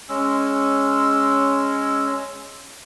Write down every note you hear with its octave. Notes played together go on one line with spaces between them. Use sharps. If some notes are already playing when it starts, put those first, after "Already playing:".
G#3 C#4 E6